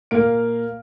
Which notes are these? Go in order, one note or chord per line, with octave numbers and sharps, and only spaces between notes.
A#2 A#3 A#4 F5 F6 D7